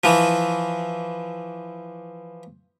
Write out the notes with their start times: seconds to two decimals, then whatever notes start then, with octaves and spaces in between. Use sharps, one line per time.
0.04 E3 F3